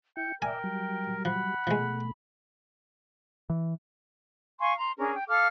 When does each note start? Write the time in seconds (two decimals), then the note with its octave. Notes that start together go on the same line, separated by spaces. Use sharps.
0.17 E4 G5 C#7
0.42 A#4 D5 E5 G5 G#5
0.64 F#3 G3
1.25 F3 F#5 B5
1.67 B2 F3 G#3 A3
3.50 E3
4.60 F5 G#5 C6 C#6
4.77 A#5 C6
4.98 C#4 D4 G#4 A#4
5.15 G5
5.28 A4 F5 D6 F6